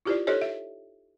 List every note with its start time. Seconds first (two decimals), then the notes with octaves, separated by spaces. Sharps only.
0.05 E4 F4 G4 A#4 C5 D5
0.27 D#4 G4 A4 C5 C#5 D#5
0.42 E5